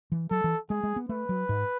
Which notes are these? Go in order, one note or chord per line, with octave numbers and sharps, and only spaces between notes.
E3
F#3 A4
E3
G#3 G#4
G#3
B3
A3 B4
F#3
G#2